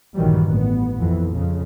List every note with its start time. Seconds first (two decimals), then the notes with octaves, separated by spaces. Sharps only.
0.15 A#1 G2 D#3 E3 F#3 G3
0.47 A1 B3
0.98 F2 E3
1.33 F2 C#3